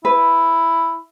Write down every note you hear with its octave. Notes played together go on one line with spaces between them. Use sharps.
E4 B4